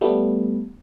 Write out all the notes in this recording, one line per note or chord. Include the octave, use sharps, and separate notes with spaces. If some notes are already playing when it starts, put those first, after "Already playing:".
G3 A3 B3